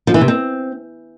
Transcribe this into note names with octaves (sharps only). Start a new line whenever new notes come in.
F3
E3
C3
C4